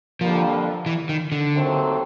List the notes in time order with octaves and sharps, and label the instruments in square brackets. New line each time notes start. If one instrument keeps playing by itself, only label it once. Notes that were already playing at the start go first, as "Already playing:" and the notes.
[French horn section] F2 D3 G3 A#3 [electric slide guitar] F3
[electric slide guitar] E3
D#3
D3
[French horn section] D#2 D#3 F#3 A3 C4